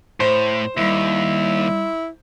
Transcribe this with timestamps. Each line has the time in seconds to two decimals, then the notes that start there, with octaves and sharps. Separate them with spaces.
0.20 A2 C5
0.77 D#2 G3 E4